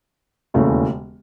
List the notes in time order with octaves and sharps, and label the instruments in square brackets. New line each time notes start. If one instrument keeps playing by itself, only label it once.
[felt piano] E1 D#2 C#3 E3 A3